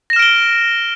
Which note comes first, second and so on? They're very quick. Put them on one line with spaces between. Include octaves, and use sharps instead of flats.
A#6 E7 F6 D7 G7